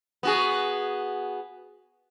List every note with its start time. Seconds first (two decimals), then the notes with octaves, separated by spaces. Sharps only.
0.23 B3 F#4 G#4